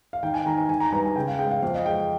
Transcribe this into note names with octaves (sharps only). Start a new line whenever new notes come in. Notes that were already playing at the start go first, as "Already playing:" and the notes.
F5
D#3 G5
G#5
D#3 A#5
G#5
D#3 G#5
A#5
G2 A#5
G#5
C#3 G5
F5
G#3 G5
F5
F2 F5
D#5
G#3 G5